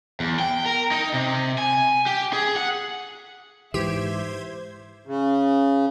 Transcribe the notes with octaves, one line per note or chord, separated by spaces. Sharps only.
E2
G5
A#4
D#4
C3
G#5
G4
G#4
F#5
G#2 E3 G4 C5 E5 G#6
C#3